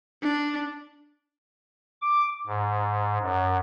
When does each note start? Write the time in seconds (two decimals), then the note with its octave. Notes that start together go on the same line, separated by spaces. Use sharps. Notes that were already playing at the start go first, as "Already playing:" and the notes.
0.23 D4
2.02 D6
2.47 G#2
3.22 F#2